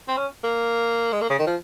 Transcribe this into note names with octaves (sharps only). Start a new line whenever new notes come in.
C4
C#4
A#3
G#3
A#3
C#3
D#3
F3